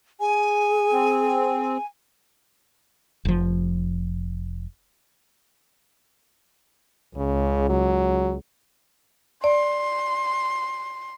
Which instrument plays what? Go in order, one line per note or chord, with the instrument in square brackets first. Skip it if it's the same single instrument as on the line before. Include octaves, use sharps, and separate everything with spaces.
[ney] G#4 [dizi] G#5
[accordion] C4
[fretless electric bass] F1 F3
[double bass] C#2 [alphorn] C#3
[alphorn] F#3
[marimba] D5 [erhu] C6